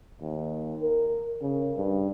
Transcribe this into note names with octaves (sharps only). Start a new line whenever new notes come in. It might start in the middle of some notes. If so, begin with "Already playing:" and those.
D#2
A#4
C#3
G2